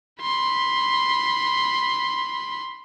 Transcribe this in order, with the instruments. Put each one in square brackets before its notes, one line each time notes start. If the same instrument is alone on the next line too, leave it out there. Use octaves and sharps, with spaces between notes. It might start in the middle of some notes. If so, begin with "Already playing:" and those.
[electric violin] B5 C6